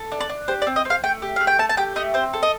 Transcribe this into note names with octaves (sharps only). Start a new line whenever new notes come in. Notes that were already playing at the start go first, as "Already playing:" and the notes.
Already playing: A4
D4
D5
D4
G4 C5
D5
C4
D#5
C4
F5
A3 G5
G4
A3 F5
G5
A3 A5
A5
G4 G5
A3 D#5
C4 C5
A4
D#5